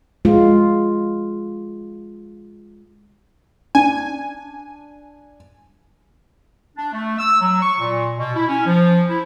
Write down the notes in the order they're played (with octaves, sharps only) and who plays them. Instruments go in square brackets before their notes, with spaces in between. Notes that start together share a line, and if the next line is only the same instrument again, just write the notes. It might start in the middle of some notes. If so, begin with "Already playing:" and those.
[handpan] G#3 F4
[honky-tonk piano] D4 [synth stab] G#5
[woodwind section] D4
A3
E6
F#3
C#6
A#2
B2
E4
C#4
F3
E4